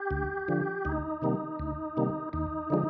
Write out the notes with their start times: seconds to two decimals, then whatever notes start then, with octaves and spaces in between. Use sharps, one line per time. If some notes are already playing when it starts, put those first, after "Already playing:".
Already playing: G4
0.11 D2
0.48 D3 F3
0.85 D2 D#4
1.22 C3 D#3 G3 A#3
1.59 D2
1.97 C3 D#3 G3 A#3
2.33 D#2 D#4
2.70 D3 F3 G#3